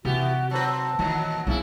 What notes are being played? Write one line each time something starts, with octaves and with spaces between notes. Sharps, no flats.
C3 E3 B3 F#4 G4
F#3 C4 B4 A5
A#2 D#3 E3 F#3
B1 C#3 F#3 E4